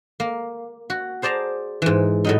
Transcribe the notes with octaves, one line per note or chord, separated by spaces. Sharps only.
A#3
F#4
G#4 C5 D5 A5 A#5
G#2 E3
A2 F#3 D#4